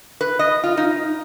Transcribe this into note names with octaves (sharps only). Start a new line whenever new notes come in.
B4
D#5
F4
D#4